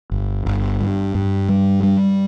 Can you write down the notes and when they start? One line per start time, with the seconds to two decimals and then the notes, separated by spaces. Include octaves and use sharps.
0.12 G1
0.46 G1
0.81 G2
1.15 G2
1.49 G3
1.83 G3